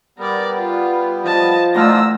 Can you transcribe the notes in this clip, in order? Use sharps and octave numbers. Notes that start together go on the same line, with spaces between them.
G3 B3 A#4 D5
F4
F3 D#5 A5
E2 A3 D4 D#4 F4 E6 F6 A#6